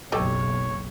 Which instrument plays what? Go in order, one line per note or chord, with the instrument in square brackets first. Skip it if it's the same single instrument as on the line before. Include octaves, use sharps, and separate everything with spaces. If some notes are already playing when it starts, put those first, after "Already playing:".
[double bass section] F#1 B1 [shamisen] G4 A4 D#5 [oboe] C#5